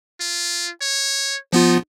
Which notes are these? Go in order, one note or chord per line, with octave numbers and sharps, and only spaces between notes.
F4
C#5
F3 B3 D#4 F4